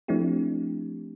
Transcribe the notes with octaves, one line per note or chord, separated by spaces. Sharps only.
F3 A3 C4 D4 E4 G4